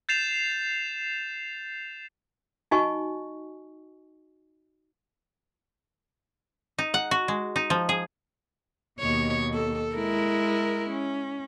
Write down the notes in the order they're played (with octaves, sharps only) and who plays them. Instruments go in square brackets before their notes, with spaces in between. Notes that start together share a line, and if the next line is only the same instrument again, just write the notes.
[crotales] G6 A6 C7 E7 F7
[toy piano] D#4 F#4 D#5 G#5 C#6
[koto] D#4
F#5
F#4
G#3
D#4
F3
G#4
[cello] D#2 B2 [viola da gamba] C#5
[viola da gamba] A4
[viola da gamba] G#3 E4 [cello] A#4
[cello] C#4